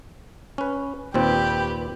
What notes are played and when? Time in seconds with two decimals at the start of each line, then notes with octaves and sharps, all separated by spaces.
0.58 C#4 B4
1.14 D#2 A#2 C4 G4 B4